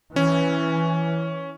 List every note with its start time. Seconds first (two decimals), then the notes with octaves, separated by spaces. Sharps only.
0.16 E3 C#4